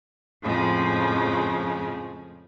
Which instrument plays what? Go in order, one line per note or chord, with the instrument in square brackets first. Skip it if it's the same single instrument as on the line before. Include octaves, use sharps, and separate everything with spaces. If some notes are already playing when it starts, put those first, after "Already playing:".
[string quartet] F2 A2 C#3 F3 G#3